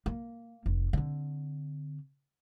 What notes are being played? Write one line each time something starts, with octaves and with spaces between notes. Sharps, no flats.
A#3
F1
D3 C4